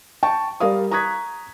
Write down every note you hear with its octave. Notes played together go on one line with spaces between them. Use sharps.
G5 A5 C#6
G3 A#4 D5 F5 D#6
A#5 C#6 D#6 F#6 G#6 B6